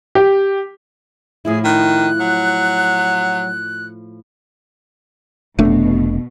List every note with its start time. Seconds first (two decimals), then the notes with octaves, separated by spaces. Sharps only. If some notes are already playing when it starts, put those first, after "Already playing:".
0.15 G4
1.45 A2 F3 E4 G#4
1.65 D#3 F#6
2.20 F#3
5.59 F1 B2 A3 D4